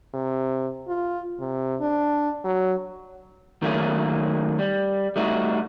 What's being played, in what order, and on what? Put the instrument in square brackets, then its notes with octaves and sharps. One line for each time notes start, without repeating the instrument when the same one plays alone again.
[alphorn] C3
F4
C3
D4
F#3
[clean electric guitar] D#3 F#3 A3 A#3 C#4 G#4
G3
G3 A3 D#4 F4 F#4